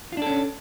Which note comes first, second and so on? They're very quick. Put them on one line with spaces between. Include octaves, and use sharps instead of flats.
F4 D4 A4 C#4